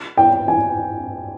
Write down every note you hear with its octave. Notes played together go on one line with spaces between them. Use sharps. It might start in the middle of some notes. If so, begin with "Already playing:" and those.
G5
G#5